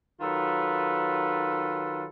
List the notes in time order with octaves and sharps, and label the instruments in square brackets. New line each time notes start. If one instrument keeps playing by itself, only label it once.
[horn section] D#3 F#3 F4 A4 B4